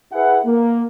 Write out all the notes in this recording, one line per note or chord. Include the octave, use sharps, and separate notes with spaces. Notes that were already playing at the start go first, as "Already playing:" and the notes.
E4 G#4 B4 F#5
A#3